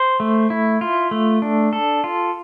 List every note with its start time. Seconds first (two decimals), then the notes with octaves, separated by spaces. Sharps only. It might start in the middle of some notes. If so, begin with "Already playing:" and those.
Already playing: C5
0.20 A3
0.50 E4
0.81 F4
1.11 A3
1.42 D4
1.73 A4
2.04 F4